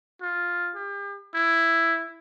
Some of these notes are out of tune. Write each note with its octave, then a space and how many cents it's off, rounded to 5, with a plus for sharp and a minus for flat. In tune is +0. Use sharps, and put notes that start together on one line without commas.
F4 +5
G4 +40
E4 +5